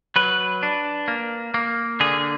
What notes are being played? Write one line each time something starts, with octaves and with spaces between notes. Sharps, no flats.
F#3 B4
D4
A#3
A#3
D3 G#4